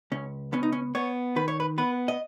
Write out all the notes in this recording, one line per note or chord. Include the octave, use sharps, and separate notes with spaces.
C#2 C#4
B3 C#4
D#4
C#4
B3 C#5
D#3 B4
C#5
B4
B3 B4
D#5